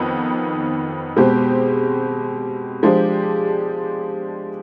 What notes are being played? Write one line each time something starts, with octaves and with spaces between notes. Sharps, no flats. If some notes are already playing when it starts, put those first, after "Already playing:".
Already playing: F2 D#3 B3 D#4
B2 G#3 C4 G4
F3 G#3 D4 G4